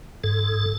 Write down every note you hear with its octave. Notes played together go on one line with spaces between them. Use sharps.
G#2 A4